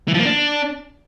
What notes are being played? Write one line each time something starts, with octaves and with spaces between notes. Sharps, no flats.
E3
F3
A#3
D4